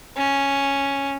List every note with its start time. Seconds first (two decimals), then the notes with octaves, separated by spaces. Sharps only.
0.17 C#4